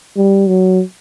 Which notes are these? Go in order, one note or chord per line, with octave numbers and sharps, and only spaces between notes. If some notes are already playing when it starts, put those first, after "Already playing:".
G3
F#3